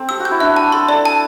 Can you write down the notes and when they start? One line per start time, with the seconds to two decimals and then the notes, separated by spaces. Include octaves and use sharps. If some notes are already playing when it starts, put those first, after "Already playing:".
Already playing: C4 A4 G5
0.09 G4 E6
0.20 F#4
0.25 G6
0.31 E4
0.40 D4 E5
0.56 A5
0.72 A4 C6
0.89 A4 D5
1.05 A5